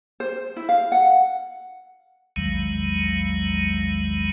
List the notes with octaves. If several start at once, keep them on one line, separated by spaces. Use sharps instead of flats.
C5
E4
F5
F#5
A#1 E2 D#3 F#3 G#3